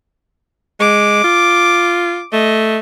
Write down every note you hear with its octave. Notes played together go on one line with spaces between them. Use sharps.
G#3 D6
F4
A3 D#5